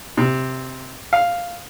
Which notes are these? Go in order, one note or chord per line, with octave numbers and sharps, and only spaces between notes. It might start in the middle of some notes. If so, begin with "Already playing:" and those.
C3
F5